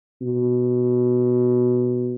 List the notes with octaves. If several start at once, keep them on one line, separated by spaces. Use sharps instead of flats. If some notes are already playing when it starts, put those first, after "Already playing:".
B2